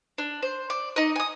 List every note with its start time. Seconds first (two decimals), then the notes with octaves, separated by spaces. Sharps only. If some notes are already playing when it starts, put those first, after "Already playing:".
0.18 D4
0.42 C5
0.70 D5
0.96 D#4 D#5
1.16 G#5 D#6